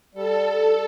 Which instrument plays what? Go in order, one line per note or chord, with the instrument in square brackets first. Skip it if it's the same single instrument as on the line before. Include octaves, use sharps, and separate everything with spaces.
[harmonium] G3 [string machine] A4